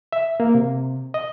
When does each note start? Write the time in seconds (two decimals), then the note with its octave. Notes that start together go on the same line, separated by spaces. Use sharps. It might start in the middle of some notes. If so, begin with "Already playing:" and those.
0.12 E5
0.40 A#3
0.54 C3
1.14 D#5